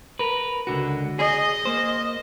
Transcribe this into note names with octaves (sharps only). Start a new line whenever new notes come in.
A#4 B4
C#2 D3 F#4
G#4 D#5
A#3 C5